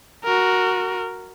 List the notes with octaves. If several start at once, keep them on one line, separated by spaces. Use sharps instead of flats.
F#4 A#4